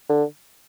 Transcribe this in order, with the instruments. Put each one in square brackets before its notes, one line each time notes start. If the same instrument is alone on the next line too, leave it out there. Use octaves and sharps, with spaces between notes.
[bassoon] D3